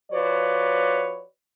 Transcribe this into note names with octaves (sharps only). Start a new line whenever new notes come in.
F3 F#4 B4 C#5 D5